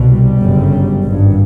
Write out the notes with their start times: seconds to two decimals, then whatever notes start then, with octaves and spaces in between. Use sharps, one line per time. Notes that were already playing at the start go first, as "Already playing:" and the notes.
Already playing: C2 B2
0.09 G3
0.40 G1 F#2 C#3
1.03 G#1 G2